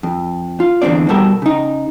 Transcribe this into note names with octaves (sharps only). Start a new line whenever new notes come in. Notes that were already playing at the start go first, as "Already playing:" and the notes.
F2
F4
E2 B2 D3 C4 D5
B2 G3 B3 A4 A#4
C#3 D#4